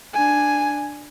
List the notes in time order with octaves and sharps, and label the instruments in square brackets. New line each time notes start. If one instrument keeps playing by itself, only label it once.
[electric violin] D4 G#5